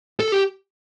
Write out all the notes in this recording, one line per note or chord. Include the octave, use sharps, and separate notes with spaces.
A4
G4